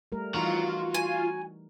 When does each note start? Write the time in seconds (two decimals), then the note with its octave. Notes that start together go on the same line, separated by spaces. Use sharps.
0.12 G3 A3 A#4
0.34 E3 D#4 F4 F#4 A#5
0.94 G#5